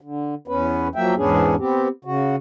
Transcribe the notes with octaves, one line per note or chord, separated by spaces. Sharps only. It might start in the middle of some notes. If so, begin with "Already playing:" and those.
D3
E2 B3 C#4 B4
F3 F#3 A#3 E5 G5
E2 G#2 B3 C#4 D4 G#4
B3 C4 G4
C#3 F#4